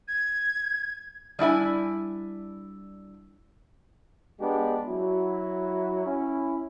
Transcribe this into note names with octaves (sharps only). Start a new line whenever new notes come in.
G#6
G3 D4 E4 G#5
G#3 B3 D4 G4
F#3 E4 F#4
C#4 E4